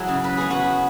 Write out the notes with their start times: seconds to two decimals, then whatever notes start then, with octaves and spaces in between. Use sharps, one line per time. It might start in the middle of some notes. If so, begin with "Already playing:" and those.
Already playing: F#3 E4 G#4
0.08 C#3
0.24 B4
0.38 B3 G#4
0.50 F#4 B4